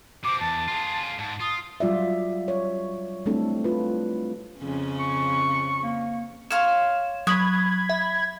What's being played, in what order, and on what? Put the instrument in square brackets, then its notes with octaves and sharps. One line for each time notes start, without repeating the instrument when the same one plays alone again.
[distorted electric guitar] B2 C4 [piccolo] D6
[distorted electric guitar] E2 [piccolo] A5
[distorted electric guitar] F4 G#4
[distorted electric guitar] G#2 [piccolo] A5
[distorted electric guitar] F4 [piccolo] D#6
[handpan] F#3 G3 F4 D5 E5
C#5
G3 A3 C4 D4 E4 A4
F4 B4
[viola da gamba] F2 C#3 C#4
[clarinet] C#6
A#3
[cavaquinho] C#5 F5 C6 [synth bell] E7
[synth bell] F#3 [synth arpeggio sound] B5 G#6 [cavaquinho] D#6
[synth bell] E5